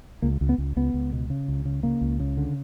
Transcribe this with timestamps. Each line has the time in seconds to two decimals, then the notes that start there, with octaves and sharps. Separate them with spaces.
0.22 C#2 A#3
0.41 C#2
0.49 B3
0.58 C#2
0.76 C#2 B3
0.94 C#2
1.12 B2
1.30 C#3
1.48 C#2
1.65 C#3
1.83 C#3 A#3
2.01 C#2
2.20 C#3
2.37 D3